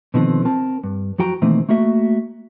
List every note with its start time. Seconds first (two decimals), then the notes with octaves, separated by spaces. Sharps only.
0.14 B2 D3 D#3 F3 B3 C4
0.45 C4 A#4 A5
0.84 G2
1.18 F2 F#3 F#4 G5 A#5
1.42 B2 D#3 E3 A3 A#3 C4
1.69 A3 A#3 F#4 E5